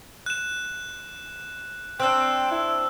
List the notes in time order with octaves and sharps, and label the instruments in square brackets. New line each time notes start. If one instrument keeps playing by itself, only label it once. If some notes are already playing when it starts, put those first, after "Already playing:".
[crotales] F#6 E7
[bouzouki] C4 D4 [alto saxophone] G5 [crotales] E6 F#6
[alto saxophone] E4